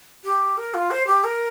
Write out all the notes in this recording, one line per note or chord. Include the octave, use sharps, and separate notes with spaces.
G4
A#4
F4
C5
G4
A#4